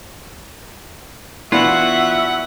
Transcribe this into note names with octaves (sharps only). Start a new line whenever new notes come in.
E3 B3 D4 F4 F#4 E5 F#5